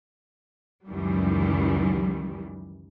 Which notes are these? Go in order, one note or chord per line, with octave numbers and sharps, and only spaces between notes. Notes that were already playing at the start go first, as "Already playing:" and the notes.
C#2 F#2 D#3 E3 F#3 G3